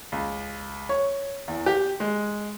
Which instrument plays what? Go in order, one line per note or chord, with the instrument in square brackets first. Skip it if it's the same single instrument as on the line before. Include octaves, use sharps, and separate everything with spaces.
[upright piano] C#2
C#5
E2
G4
G#3